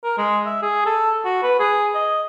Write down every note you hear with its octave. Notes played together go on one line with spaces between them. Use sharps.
A#4
G#3
E5
G#4
A4
F#4
B4
G#4
D#5